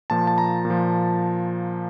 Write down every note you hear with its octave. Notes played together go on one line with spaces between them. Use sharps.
A#2 F3 A5
A5
A#5
A#2
F3